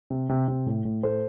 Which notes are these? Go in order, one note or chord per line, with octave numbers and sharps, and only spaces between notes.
C3
C3
C3
A2
A2
A2 A4 C5